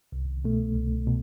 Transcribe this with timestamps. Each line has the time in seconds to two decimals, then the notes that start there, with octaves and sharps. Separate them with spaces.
0.12 C2
0.44 B2 A3
0.76 C2
1.07 B2